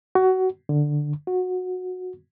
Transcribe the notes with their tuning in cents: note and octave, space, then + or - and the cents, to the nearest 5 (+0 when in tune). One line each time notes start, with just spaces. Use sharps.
F#4 +20
D3 +5
F#4 -15